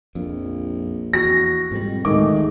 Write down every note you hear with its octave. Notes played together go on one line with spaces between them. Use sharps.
A#1 F2
E2 F#4 A#6
F2 G#2 B2 G3
D2 A2 D#3 G#3 A3 D6
D#2